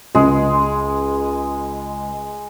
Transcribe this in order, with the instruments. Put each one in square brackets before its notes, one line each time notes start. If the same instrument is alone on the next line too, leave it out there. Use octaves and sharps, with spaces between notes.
[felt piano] C#2 [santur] G#3